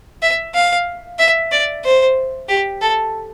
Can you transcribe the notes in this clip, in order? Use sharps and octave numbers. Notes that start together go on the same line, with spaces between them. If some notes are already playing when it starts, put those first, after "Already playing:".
E5
F5
E5
D5
C5
G4
A4